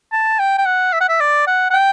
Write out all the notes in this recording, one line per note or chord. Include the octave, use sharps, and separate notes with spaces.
A5
G5
G5
F#5
E5
F#5
E5
D5
F#5
F#5
G5